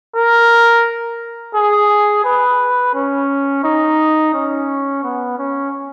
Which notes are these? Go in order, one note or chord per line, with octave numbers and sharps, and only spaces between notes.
A#4
G#4
B4
C#4
D#4
C#4
B3
C#4